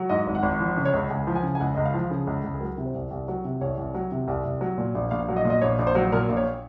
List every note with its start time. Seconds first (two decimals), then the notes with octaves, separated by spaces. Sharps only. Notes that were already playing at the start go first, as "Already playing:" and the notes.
Already playing: F#3
0.09 G#2 D#5
0.26 G#1
0.35 F#5
0.43 G#1
0.60 F3
0.77 C#3
0.85 C#5
0.93 C#2
1.10 C#2 G#5
1.27 F3
1.35 G#5
1.43 C#3
1.55 G#5
1.60 C#2 F#5
1.75 C#2 D#5
1.85 F5
1.94 F3
2.10 C#3 G#4
2.27 C#2
2.44 C#2
2.54 G#4
2.61 F#3 A#4
2.78 C3
2.86 C5
2.94 C2
3.11 C2
3.28 F#3
3.45 C3
3.61 C2 C#5
3.77 C2
3.94 F#3
4.12 C3
4.28 C2
4.45 C2
4.61 F#3
4.78 A#2
4.95 A#1
5.11 A#1 F5
5.28 F#3
5.36 D#5
5.45 A#2
5.50 D#5
5.61 A#1 C#5
5.79 A#1
5.87 C5
5.95 F#3
6.12 A#2 A#4
6.29 A#1
6.37 C#5